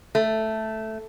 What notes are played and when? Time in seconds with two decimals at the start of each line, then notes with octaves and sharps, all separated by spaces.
0.15 A3